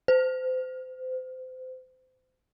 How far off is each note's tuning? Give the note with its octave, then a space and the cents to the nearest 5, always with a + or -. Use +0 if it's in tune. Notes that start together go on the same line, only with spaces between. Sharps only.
C5 -30